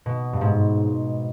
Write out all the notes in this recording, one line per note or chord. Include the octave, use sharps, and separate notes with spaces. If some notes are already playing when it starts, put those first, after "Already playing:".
B2
G2
G#2